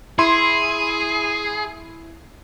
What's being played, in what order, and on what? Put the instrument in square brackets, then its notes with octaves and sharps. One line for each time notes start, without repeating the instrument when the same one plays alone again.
[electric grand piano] E4 C6 [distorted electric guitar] G#4